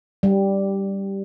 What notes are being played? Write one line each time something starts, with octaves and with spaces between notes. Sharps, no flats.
G3